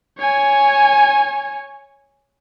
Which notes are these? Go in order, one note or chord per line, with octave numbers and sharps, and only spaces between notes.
C#5 G#5